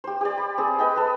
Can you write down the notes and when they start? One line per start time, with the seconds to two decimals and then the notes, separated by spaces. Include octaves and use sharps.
0.04 G4 C5
0.21 G4 D5
0.38 B5
0.58 C4 G#4
0.79 B4 D#5 G5 B5
0.96 A4 B4